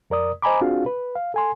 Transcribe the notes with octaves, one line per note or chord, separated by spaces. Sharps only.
F2 A#4 D5 D#6
C5 D#5 G#5 A#5 B5 D6
C4 D4 F4 F#4 G#4 F5
B4
F5
A4 G#5 C6